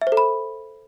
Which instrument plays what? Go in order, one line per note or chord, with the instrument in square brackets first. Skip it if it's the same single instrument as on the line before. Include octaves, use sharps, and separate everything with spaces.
[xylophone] E5
C5
A4
B5